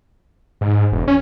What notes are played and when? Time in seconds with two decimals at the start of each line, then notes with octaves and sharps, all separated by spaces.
0.61 G#2
0.92 E1
1.08 C#4